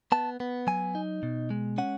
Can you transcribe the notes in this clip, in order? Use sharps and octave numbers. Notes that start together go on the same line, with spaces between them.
B3 A5
B3
F#3 G#5
D#4
B2
G#3
C#4 F#5